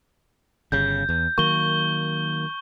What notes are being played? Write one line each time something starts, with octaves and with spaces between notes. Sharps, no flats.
G1 C#3 G6
E2
D#3 F#3 A#3 C#6 G7